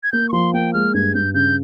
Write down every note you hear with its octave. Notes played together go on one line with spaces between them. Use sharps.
G#6
A#3 G6
C#6
F3 C6
A#3 G5
G#3 F6
G2 G#6
G2 G6
C#3 G6